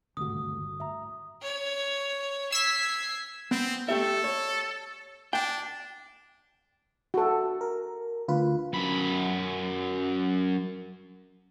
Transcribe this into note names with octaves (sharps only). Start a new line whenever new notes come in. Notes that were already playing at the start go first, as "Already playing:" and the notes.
G1 D#2 G#2 C3 A3 F#4 D#6
A2 E5 A#5
C#5
E6 G#6 B6 C7
B3 C4
A3 G4 A4 E5
C#5
D4 G5
F#4 A4
A#4
D2 F4 B4
F#2 B5